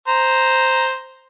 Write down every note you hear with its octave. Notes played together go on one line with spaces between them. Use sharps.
C5 A#5